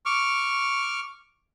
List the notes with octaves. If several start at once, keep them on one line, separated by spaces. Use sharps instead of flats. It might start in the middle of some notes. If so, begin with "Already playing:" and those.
C#6 D6 F6